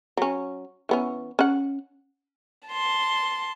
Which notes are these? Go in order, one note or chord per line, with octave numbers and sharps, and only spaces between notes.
F#3 C#4
E3 B3 C#4
C#4 F#5
A5 C6